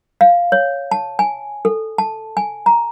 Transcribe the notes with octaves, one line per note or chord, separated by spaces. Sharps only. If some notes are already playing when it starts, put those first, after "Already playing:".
F5
C#5
A5
G#5
A4
A5
G#5
A#5